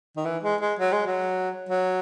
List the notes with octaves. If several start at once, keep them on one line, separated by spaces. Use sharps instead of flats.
D#3
E3
G#3
G#3
F#3
G#3
F#3
F#3